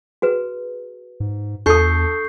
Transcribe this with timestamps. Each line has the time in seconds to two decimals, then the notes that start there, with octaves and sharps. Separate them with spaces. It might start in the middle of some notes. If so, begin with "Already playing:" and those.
0.22 F#4 G#4 B4
1.20 G#2
1.66 E2 D4 A4 C#6 D#6 G6 C7